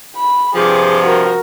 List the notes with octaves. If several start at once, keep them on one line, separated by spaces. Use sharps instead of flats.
B5
G2 C3 F3 G#4 D6
F#4 A#4